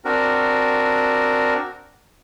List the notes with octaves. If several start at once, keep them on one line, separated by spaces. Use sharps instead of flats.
C4 D4 F#4 A#4